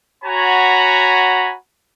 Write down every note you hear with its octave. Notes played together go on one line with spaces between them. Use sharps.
F#4 C#5 F#5 G#5 A#5 B5